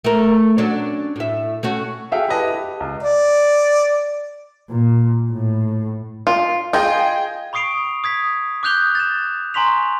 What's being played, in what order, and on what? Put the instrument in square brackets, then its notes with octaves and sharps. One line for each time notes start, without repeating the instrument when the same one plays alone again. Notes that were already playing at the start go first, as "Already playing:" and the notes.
[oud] A3 A#4
F#3 C#4 D4
A2 E5
A3 C#4 F#4
[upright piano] F#4 G#4 A4 E5 F5 G5
E4 G4 A4 B4 D#5 A5
G4
C#2
[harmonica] D5
[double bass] A#2
A2
[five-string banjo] F4
[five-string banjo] F4 [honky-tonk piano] G#4 D#5 G5
[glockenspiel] B5 C#6 D#6 C7 D7 F7
D#6 G#6 B6
D6 D#6 F#6 G6 F7 G7
A6 E7
G#5 A#5 C6 C#6 B6 F7